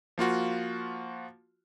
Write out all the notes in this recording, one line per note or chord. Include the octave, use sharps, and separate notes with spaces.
F3 A#3 F4 F#4